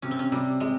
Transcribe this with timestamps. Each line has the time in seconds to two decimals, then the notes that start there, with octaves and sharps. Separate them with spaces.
0.02 C3 C#4
0.11 C4
0.19 C#4
0.32 C3 G3
0.60 C3 G#3